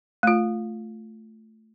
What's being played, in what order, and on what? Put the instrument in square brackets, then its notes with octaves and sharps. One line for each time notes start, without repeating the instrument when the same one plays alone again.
[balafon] A3 F4